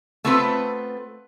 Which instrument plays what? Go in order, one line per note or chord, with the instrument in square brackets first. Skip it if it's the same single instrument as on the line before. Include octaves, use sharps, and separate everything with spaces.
[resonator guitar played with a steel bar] A3 B3 C4 F4 B4